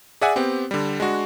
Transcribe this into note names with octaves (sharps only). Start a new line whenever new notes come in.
G#4 D5 E5 F#5 G#5
B3 C4 G4
D3 G3
G#3 D4 F#4